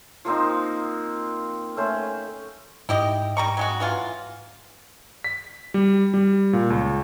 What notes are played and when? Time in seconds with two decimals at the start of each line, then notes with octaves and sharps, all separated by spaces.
0.25 F3 A#3 C4 D#4
1.76 A3 C#4 C5
2.89 G#2 E4 G4 D#5
3.37 G3 A#5 C#6
3.57 F#3 G#3 F#4
3.80 E3 F#3 F4
5.24 B6
5.74 G3
6.14 G3
6.53 A#2
6.70 C#2